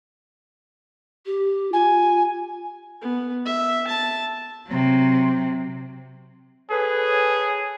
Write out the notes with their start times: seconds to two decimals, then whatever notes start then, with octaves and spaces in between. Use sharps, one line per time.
1.26 G4
1.73 F4 G#5
3.01 B3
3.46 E5
3.87 A5
4.67 C3 F#3
6.70 G#4 A4 B4 C#5